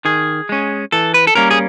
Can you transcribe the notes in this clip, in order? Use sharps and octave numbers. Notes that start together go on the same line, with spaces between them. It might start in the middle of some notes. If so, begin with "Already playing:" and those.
D#3 G#4
G#3 C#4
E3 A4
B4
A4
G3 A#3 C#4 A#4
G#4